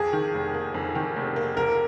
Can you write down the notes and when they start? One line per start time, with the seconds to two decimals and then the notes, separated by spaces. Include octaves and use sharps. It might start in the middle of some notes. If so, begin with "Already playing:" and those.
Already playing: F2 G#4
0.13 D#3
0.34 F1
0.54 A#3
0.74 F2
0.95 D#3
1.16 F1
1.36 A#3
1.57 F2 A#4